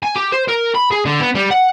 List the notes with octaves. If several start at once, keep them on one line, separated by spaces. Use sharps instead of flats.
G#5
G4
C5
A#4
B5
G#4
D3
B3
G3
F#5